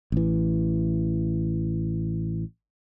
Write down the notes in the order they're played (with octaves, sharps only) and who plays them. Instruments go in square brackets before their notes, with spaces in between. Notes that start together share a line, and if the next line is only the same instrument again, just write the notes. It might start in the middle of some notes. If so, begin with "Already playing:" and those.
[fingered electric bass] A1 E3